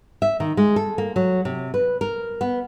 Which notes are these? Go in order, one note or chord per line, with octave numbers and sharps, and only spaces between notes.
E5
D#3
G#3
A4
A#3
F#3
C3
B4
A#4
B3